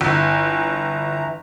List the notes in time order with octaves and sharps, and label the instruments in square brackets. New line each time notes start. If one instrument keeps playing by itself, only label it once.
[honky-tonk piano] G1 [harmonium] E3 A#5